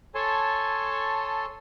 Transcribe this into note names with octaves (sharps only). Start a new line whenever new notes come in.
A4 C#5 G#5 A5 C6